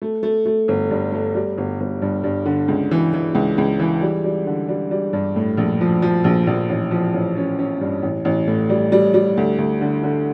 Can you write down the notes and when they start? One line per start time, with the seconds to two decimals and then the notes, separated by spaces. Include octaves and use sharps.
0.02 A3
0.23 A3
0.46 A3
0.68 G1
0.91 G2
1.12 A3
1.35 G3
1.58 G1
1.80 G1
2.02 G2
2.24 G2
2.46 D3
2.68 C#2
2.91 E3
3.14 E3
3.35 C#2
3.58 C#2
3.80 E3
4.02 G3
4.24 G3
4.46 D3
4.69 G3
4.91 G3
5.13 G2
5.36 A2
5.57 A#1
5.81 F3
6.02 F3
6.24 A#1
6.47 A#1
6.70 A1
6.91 F3
7.14 A1
7.36 C#4
7.59 C#4
7.81 G2
8.02 A1
8.25 A1
8.47 A2
8.70 G3
8.92 G3
9.14 G3
9.37 D2
9.58 D2
9.81 D3
10.03 D3